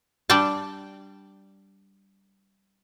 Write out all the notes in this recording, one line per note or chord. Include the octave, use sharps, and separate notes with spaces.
G3 D4 D5 G5 A5